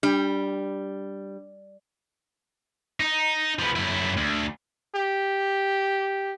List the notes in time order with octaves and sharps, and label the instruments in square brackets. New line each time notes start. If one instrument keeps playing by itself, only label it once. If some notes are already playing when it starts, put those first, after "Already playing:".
[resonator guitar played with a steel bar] G3 [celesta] D4
[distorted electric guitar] D#4
F3 B3
F#2 E4
D2
[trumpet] G4